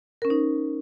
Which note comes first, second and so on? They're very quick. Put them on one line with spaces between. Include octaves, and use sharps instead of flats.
A#4 C#4 C5 D#4